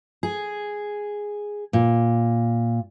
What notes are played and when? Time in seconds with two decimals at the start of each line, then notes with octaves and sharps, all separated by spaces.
0.23 G#4
1.73 A#2